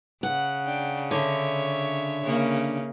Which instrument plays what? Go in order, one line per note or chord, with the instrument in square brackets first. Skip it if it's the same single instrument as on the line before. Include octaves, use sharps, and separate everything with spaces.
[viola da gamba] C#3 [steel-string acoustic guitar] F#5
[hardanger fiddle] D4 G5
[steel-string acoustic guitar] D3 [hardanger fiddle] C#5 E5
[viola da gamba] C#3 A#3